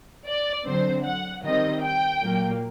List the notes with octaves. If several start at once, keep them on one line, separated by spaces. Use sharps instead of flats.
D5
D3 F#3 C4 C5
F#5
D#3 G3 C4 D#5
G5
A#2 F#3 A#3